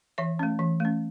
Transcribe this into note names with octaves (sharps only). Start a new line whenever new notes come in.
E3 C#5 E5
A3 C#4
E3
A3 C#4